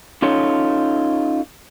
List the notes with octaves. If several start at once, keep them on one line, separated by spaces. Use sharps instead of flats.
C#4 D#4 F4 A4 C#5